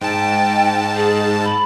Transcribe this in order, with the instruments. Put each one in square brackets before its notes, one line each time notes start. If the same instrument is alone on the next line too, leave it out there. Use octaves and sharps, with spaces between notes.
[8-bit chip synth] G#2 A5 [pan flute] G5
[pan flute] G#4
B5